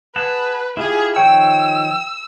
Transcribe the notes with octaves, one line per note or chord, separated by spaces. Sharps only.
G#4 B4 F#5 A5
E4 F4 G4 G#4
D#3 F3 C#5 G5 E6